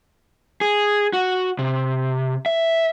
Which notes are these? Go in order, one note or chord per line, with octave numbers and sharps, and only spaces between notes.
G#4
F#4
C3
E5